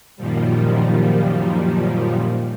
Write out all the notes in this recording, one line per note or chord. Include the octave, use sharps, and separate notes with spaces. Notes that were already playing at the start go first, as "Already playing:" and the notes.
F#2 A#2 D#3 F3 G3